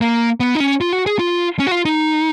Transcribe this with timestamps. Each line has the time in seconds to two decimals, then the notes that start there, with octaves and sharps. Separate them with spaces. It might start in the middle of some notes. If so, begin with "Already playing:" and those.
0.01 A#3
0.40 B3
0.55 D#4
0.60 C#4
0.81 F4
0.93 F#4
1.06 G#4
1.19 F4
1.59 C#4
1.67 F#4
1.71 F4
1.85 D#4